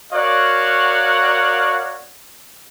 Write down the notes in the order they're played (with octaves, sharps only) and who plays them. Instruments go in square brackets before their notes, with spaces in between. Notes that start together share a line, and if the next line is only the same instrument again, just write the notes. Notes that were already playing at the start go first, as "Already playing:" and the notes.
[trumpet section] F#4 A#4 C#5 D5 F5 F#5